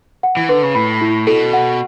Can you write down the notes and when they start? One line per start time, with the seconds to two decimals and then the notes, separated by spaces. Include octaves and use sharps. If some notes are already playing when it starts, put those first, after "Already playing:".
0.23 F#5
0.37 E3
0.49 D3 B4
0.63 C#3
0.75 A2 B5
1.01 E4
1.27 B2 A4
1.53 F#5